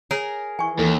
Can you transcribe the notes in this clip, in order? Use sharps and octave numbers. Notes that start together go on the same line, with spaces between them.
G#4 A#4 C#5
E3 G#5 C#6
D#2 A4